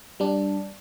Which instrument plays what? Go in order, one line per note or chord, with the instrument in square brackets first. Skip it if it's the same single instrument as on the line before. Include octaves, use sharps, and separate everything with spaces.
[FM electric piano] G3 D4